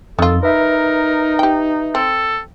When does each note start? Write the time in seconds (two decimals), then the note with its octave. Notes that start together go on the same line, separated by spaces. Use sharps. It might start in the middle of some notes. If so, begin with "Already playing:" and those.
0.19 F2 D#3 F4 A4
0.43 D#4 A#4 B4 E5
1.39 G4 G5
1.95 C4 A4